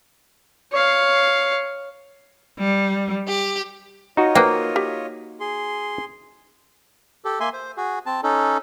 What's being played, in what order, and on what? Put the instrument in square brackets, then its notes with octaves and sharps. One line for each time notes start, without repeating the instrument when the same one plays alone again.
[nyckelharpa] C#5 F5
[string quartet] G3
G4
[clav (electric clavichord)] D#4 F#4 [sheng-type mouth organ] F4 C#5 D#5
[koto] A#3 [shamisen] B4 C5 G5
[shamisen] G4
[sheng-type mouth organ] G#4 C6
[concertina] G4 A4
A#3 E5 G#5 C6
C5
F#4 G#4
C4 A5
C#4 D#4 A4